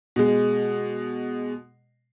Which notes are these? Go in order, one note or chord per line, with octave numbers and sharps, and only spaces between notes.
B2 G#3